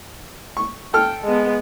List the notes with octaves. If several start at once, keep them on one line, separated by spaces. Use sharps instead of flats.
C#6
A4 G5 F6
G#3 B3